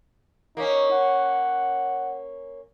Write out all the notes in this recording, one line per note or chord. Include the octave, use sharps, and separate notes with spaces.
A#3 C#4 D#4
F#5